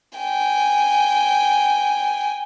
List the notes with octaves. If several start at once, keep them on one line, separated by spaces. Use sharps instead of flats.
G5 G#5